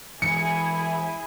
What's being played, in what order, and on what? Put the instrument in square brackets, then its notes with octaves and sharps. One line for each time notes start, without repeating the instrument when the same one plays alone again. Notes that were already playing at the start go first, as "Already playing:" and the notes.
[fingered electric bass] E3 G#3 [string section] E4 G#4 [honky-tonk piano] C#7